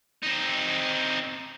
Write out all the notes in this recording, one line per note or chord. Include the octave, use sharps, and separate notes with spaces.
C4 D#4